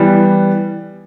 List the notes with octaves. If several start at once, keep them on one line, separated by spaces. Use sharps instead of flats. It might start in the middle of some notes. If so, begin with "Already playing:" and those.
Already playing: E3 G3 B3